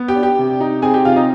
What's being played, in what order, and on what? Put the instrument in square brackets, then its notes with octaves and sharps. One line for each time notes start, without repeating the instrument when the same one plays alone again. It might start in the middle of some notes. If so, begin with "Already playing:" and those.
Already playing: [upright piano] B3
G4 G5
D4
G4 G5
C3
D#4
C4 G#4 G#5
G4 G5
C3 F4 F5
D#4 D#5